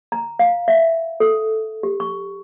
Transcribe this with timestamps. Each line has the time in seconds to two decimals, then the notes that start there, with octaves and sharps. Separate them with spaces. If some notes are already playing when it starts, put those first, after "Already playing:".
0.12 A#5
0.39 F5
0.68 E5
1.20 A4
1.83 G4
2.00 C#6